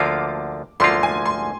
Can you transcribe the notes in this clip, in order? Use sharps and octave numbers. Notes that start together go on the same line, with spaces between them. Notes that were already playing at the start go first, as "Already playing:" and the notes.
Already playing: D2 D3 F3 A#3 F4 D6
D2 D3 F3 A#3 F4 C6
G#5
C6